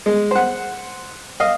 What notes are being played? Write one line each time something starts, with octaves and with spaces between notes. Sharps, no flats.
G#3
C5 F#5
D#5 F5